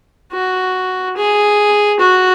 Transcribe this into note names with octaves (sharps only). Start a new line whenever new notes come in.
F#4
G#4
F#4